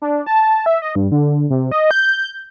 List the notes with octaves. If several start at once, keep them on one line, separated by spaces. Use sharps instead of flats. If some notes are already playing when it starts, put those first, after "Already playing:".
D4
A5
E5
D#5
G2
D3
C3
D#5
G6